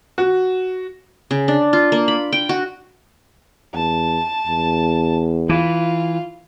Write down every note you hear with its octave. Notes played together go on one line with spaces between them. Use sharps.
F#4
C#3
D4
F4
A#3
B5
G5
F#4
E2 A5
E2
E3 F4